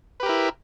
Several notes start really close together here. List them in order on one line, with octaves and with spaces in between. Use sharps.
B4 G4 A#4 E4